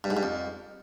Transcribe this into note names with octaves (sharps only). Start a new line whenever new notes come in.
G2
G#2
G2
F2